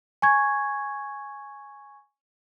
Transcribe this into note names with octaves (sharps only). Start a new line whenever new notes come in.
G#5 C#6 G#6